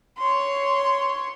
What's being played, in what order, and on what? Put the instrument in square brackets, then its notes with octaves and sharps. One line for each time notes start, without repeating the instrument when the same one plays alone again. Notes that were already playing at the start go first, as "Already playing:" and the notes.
[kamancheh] C#5 C6